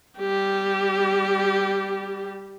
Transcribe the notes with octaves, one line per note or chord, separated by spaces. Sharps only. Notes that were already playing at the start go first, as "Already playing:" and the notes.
G3 G4